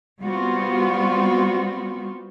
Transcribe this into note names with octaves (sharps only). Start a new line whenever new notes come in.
G3 B3 C4 F4 F#4